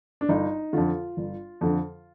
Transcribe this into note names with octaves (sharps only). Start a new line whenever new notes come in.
D4
G1 D#4
F2 D3 F4
G1
F2 D3